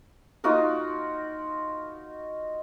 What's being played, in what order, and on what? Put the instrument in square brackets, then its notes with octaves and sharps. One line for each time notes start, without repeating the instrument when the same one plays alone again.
[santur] D#4 F4 F#4 A#4